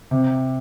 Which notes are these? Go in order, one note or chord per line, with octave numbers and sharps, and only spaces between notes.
C3